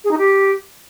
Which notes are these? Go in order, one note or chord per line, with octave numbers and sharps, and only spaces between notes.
G#4
D#4
G4